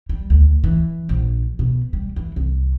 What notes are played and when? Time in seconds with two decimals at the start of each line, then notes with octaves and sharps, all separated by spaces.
0.09 G3
0.30 D2
0.64 E3
1.09 A#1
1.59 B2
1.93 G3
2.16 E3
2.36 C2